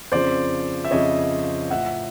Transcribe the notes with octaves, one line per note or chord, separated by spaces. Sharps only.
F2 C#3 F3 C5 D5
E5
F2 C#3 F3 C#5 D#5
A2 F3 E5 F#5